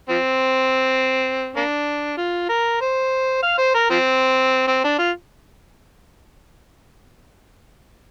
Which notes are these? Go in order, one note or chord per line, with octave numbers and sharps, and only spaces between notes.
F3 C4
A#3 D4
F4
A#4
C5
F5
C5
A#4
F3 C4
C4
D4
F4